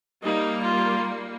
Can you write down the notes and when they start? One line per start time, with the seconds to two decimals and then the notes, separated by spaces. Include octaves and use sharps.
0.23 G3 A#3 D#4
0.63 F4